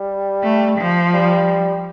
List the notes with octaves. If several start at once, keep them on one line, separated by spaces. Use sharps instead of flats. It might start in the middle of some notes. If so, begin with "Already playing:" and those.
Already playing: G3
A3
F3
G3